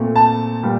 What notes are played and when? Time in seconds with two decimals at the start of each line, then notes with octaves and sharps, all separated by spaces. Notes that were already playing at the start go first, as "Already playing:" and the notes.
Already playing: A#2 A3 C4
0.16 A5
0.63 A#2 G3